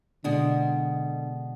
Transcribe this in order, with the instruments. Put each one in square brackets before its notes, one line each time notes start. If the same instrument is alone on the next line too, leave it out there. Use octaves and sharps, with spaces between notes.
[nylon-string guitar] B2 G#3 D4 [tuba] D3